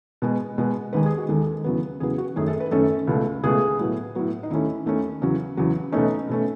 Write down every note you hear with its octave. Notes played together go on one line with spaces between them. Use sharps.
B2 G#3 B3
B2 G#3 B3
D#2 D#3 G#3 B4
G#4
F#4
D#2 D#3 G#3 A4
E2 C#3 F#3 B3
E2 C#3 F#3 B3 G#4
F#4
F#2 D#3 A3 C#4 G#4
A4
B4
F#2 D#3 A3 C#4 A4
C#2 B2 A3
C#2 B2 A3 G#4
A2 F#3 B3
A2 F#3 B3
D#4
D#2 D#3 A3 C#4 E4
D#2 D#3 A3 C#4
E2 C#3 F#3
E2 C#3 F#3
B2 A3 C#4 D#4
B2 A3 C#4